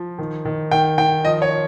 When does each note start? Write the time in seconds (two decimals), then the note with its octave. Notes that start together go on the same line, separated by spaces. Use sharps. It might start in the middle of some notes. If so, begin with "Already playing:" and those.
Already playing: F3
0.18 D#3
0.45 D#3
0.71 D#3 G5
0.98 D#3 G5
1.25 F3 D#5
1.42 C#5
1.51 F3